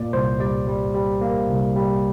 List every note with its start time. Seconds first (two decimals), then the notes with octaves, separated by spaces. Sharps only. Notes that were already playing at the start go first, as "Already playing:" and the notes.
Already playing: A#2 A#3 D5
0.13 C2 C5
0.40 G3 D5
0.67 G3
0.95 G3
1.21 A#3
1.48 C2
1.76 G3